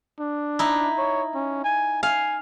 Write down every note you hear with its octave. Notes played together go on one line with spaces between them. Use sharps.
D4
D#4 E4
C#5
C#4
G#5
F5 G#5